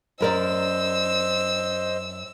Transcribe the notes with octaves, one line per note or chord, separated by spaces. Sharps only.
F#2 A#4 C5 D5 D#5 E6